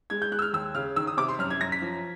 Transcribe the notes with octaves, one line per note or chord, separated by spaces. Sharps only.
G#3 G#6
G6
G#3 F#6
E6
F6
D#2 E6
C#3 F6
D#3 E6
D#6
C3 D6
C6
F#2 F6
G#6
F#2 A#6
B6
F3